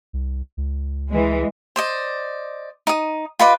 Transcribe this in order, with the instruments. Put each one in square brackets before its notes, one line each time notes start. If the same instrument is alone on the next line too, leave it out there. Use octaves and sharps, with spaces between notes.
[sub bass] C2
C#2
[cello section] E3 G#3
[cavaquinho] C5 D5 D#5
D#4 D#6
F4 B4 D#5 D6